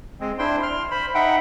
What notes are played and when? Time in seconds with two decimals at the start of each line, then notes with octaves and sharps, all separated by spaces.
0.20 G#3 C4
0.39 D4 E4 C5 G5 C6
0.63 C6 F6
0.91 C5 B5
1.15 D#4 E5 F#5 G5 B5